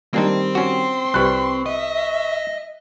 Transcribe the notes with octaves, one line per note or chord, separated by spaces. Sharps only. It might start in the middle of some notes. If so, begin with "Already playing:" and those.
D#3 G3 A#3 C4 D4 D#4 C5
C#4 F#4 C6
C2 G3 B4 C#6 F#6
D#5 E5